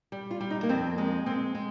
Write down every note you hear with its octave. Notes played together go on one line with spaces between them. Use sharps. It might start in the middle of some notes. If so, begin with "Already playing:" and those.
G3
F4
G3
D#4
A#3
F2 C4
G#3 A#3
G#3 C4
G#3